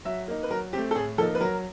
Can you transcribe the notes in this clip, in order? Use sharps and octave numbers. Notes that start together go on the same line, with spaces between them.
F#3 E5
A#3 D#4
B4
F#3 A#4
A3 C4 G4
A4
A2 G#4
F3 A#3 D#4 A4
B4
F#3 A#4